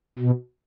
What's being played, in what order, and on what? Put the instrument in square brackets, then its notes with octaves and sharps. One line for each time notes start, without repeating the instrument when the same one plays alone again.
[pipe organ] B2